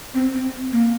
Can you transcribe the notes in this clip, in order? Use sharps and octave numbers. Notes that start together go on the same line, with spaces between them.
C4
C4
A#3